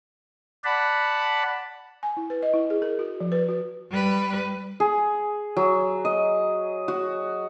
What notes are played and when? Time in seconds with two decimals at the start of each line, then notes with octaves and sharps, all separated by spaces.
0.64 D5 F#5 A5 B5
2.03 G#5
2.17 E4
2.30 B4
2.43 D#5
2.54 E4
2.70 G#4
2.82 A#4
2.99 F#4
3.20 F3
3.32 B4
3.49 F#4
3.90 G3 B4
4.80 G#4
5.57 F#3
6.05 D#5
6.88 F#4